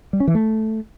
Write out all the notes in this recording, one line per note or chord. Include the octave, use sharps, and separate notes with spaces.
G3
C#4
E3
A3